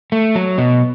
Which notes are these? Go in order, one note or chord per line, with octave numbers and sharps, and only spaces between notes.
A3
F#3
B2